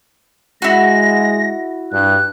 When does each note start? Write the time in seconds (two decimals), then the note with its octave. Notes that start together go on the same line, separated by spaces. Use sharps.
0.62 G#3 E4 F#4 A#6
1.92 G2 F#6